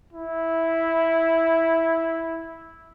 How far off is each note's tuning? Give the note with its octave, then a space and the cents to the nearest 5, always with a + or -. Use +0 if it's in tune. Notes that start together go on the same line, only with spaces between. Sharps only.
E4 -5